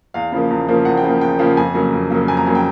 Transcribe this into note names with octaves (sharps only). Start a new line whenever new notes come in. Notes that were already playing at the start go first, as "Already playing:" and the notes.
E2 F5
C#3 F3 A#3
E2
C#3 F3 A#3
E2 F#5
G5
C#3 F3 A#3
E2 G5
C#3 F3 A#3
F2 G#5
C#3 F#3 A#3
F2
C#3 F#3 A#3
F2 G#5
A#5
C#3 F#3 A#3 G#5
G5